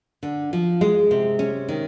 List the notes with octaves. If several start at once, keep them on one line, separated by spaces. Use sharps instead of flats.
D3
F3
G#3
C3
C#4
D#3